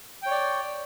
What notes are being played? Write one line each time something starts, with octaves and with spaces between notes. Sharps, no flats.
C#5 D5 G5